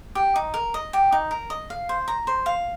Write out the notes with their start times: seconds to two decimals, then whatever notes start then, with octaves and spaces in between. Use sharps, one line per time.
0.15 G4
0.36 D#4
0.54 A#4
0.74 D#5
0.93 G4
1.12 D#4
1.31 A#4
1.50 D#5
1.70 F5
1.89 C5
2.08 A#5
2.27 C5
2.46 F5